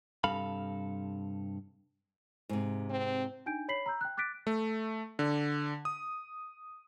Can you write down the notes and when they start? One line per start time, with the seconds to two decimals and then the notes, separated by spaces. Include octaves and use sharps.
0.24 G2 C3 A4 F5 B5
2.49 G#2 C3
2.90 C4
3.46 D4 D#4 G5 G#5 G6 D7
3.68 C#5 B5 B6 C7 F#7
3.86 A#5 E6 G6
4.01 G5 F#6
4.17 D6 F#6 A6 B6 D7
4.47 A3
5.19 D3
5.85 D#6